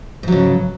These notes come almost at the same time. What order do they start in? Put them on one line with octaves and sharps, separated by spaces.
G#2 F#3 C#3